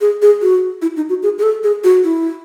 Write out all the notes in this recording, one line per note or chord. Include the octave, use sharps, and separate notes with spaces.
G#4
G#4
F#4
E4
D#4
F#4
G#4
G#4
A4
G#4
F#4
E4